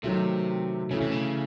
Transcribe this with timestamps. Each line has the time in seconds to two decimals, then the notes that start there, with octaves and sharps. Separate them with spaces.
0.03 C3 D#3 F#3 A3
0.91 C#3 E3 A3 C#4
1.01 C3
1.12 C#3